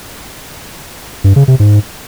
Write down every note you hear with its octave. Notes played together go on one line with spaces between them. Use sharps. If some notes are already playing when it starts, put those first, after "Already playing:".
G2
C#3
C3
G#2